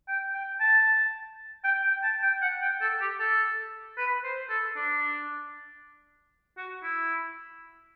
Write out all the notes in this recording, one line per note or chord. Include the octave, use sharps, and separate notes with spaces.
G5
G5
A5
G5
G5
A5
G5
F#5
G5
A4
G4
A4
B4
C5
A4
D4
F#4
E4